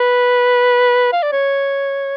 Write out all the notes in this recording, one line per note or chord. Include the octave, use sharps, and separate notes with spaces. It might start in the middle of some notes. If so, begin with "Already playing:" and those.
Already playing: B4
F5
D5
C#5